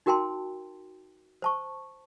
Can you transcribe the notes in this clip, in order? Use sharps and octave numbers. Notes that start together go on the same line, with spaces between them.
D#4 F#4 A#4 G5 A5 C6
C5 A5 C#6